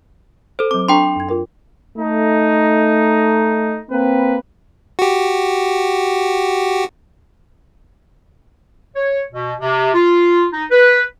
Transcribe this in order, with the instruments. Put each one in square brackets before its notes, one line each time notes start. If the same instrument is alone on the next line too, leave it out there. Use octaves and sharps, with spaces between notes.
[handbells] A4 C5
[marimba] F#3 C4 [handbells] D6
[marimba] D4 A#5 C#6 [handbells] A4 G5 C6
[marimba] F#2 G#6
F4 A#4 G5
[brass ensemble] A3 D#4
A#3 C4 B4
[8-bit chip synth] F#4 G4
[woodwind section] C#5
B2
C3
F4
D#4
B4